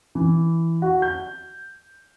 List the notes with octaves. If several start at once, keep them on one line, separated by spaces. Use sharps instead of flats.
E3
F#4
G6